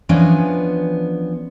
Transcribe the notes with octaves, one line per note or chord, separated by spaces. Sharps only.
E3 F3 B3 C#4 D4